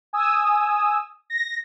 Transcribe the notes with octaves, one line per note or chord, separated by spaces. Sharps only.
G#5 D#6 E6
A#6